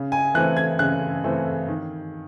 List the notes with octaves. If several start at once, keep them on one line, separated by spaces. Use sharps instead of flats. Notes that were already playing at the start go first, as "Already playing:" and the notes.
Already playing: C#3
G#5
E3 A3 C4 F#6
G#6
C#3 F#6
E3 A3 C4
D#3